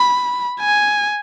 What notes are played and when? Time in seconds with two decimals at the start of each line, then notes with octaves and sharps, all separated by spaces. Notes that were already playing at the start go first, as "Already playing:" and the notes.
Already playing: B5
0.60 G#5